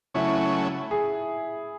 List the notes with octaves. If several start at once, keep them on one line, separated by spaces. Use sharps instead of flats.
C#3 F#3 A3 C#4 E4
G#4